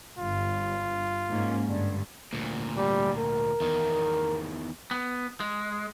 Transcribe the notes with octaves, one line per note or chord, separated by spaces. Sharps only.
G1 G2 F4
G#2 A#3 C#4
G2 D3
D2 A#2
G3
A#4
E2 D#3
B3
G#3